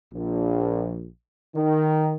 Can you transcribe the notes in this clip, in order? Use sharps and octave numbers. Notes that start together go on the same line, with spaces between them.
A#1
D#3